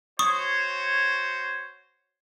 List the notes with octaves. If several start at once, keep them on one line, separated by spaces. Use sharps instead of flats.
F#4 C5 C#5 C#6 D#6